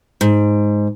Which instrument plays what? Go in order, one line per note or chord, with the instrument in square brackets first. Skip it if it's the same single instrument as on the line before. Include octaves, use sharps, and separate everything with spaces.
[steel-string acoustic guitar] G#2